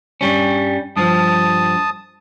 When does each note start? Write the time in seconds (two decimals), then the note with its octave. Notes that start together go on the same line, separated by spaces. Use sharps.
0.21 G2 G3 C#4
0.97 G2 F3 A5 D#6